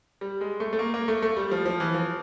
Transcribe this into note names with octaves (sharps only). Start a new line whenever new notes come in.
G3
G#3
A3
A3
A#3
A#3
A3
A3
G3
F3
F3
E3
F3